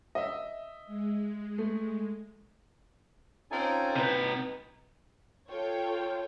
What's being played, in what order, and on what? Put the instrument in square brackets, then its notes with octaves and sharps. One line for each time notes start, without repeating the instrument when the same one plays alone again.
[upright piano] D#5 E5
[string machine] G#3
[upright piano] A3
[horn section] C4 C#4 F4 [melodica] D#4 A4 G#5
[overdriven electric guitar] C3 B4 [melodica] D#4
[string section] F4 A4 C#5 G5